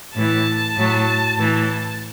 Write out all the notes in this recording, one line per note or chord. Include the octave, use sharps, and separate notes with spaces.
A2 E3 A5
A2 F#3
A2 E3